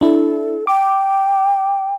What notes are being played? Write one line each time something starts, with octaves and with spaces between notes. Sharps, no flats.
D4 E4 A4
G5 D6